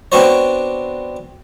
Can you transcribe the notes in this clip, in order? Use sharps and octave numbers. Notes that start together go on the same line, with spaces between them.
B3 C4 D4 F#4 C5 C#5